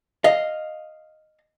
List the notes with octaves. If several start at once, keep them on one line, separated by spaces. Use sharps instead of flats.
D#5 F5